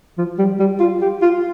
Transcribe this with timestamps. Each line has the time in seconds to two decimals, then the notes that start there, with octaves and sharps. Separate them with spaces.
0.18 F3
0.38 G3
0.59 G3
0.80 F4
1.01 G4
1.22 F4